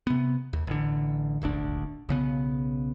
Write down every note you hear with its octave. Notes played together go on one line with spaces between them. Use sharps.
C3 B3
D#2
A1 D3
D#1 G#1 D2 D4
B1 C#3 B3